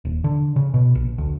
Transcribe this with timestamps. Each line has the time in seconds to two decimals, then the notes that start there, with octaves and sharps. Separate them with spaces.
0.05 D#1
0.24 D3
0.56 C#3
0.74 B2
0.95 A#1
1.18 D2